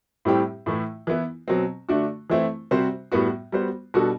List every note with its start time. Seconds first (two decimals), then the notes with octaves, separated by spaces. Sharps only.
0.25 A2 G3 C4 E4 G4
0.66 A2 E3 A3 E4
1.07 E3 B3 E4
1.48 B2 F#3 C4
1.89 D3 A3 D4 F#4
2.30 E3 A3 C4 E4
2.71 C3 G3 C4 F#4 C5
3.12 A2 G3 B3 F#4
3.52 G3 B3 F#4 C5
3.94 B2 G3 D4 F#4 A4